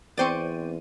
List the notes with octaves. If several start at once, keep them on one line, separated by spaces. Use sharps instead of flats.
E2 C4 C5 D5 G5 C#6 D#7